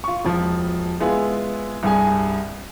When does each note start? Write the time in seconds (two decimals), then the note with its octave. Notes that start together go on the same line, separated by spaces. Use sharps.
0.04 F4 C#6
0.25 E1 F3
1.00 G#3 B3 E4 F4 G#4
1.83 C2 G2 G#4 G#5